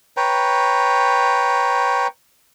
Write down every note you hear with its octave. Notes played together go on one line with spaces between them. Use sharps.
B4 C#5 G5 A#5